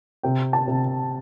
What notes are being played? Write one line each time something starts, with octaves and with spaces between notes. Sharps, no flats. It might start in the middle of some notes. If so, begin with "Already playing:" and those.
C3 G5
A5
C3